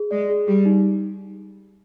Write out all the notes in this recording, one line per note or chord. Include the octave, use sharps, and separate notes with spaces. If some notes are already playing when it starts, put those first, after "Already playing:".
Already playing: G#4
G#3 D5
G#4
G3 G4
D#4